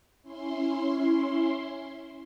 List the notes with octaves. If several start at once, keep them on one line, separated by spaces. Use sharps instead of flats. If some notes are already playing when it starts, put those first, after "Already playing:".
C#4 E4 C6